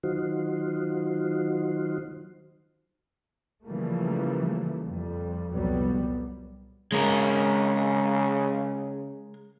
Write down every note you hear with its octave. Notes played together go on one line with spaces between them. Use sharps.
D#3 F#3 D#4 F4 F#4 C5
C#3 E3 F3 G3 A3 A#3
F2 G3
C2 F2 A#2 F#3 G3 B3
C#3 G#3 A#4